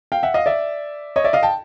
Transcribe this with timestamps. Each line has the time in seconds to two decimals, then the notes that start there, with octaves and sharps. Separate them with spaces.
0.12 F5 G5
0.23 E5 F#5
0.34 D#5 F5
0.46 D5 E5
1.16 C#5 D#5
1.24 D5 E5
1.33 D#5 F5
1.43 G5 A5